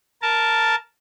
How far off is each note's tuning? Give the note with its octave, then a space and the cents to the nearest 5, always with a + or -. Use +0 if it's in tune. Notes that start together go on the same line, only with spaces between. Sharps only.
A#4 -5 A5 +0